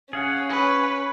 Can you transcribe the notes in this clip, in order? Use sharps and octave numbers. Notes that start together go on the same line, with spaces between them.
C#4 G#4 F5 F#5
B4 C#5